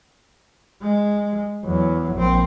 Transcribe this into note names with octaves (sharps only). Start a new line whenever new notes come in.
G#3
E2 F#3
A#1 C4